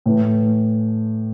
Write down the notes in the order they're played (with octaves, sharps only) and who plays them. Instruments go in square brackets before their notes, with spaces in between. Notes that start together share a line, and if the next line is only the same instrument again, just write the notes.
[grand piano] A2 E3 A3